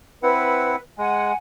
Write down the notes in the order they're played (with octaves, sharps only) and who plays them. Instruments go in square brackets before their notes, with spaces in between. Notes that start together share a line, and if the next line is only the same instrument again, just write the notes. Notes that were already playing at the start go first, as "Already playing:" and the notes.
[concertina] C4 E4 F#5 [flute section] B4
[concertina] G#3 [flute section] F#5 G#5